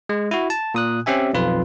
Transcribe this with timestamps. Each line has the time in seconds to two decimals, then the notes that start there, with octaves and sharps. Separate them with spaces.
0.09 G#3
0.31 E4 F#4
0.50 A5
0.74 A#2 D#6 F#6
1.06 C4 C#4 G4 E5 G#5
1.33 B1 F2 F4 B4